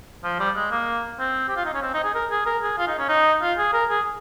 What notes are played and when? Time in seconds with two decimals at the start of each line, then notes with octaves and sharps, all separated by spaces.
0.24 F3
0.39 G3
0.56 G#3
0.71 A#3
1.19 C4
1.49 G4
1.56 F4
1.66 D#4
1.74 C#4
1.82 C4
1.94 D#4
2.04 G#4
2.14 A#4
2.31 G#4
2.46 A#4
2.63 G#4
2.78 F4
2.88 D#4
2.98 C#4
3.09 D#4
3.42 F4
3.58 G#4
3.73 A#4
3.90 G#4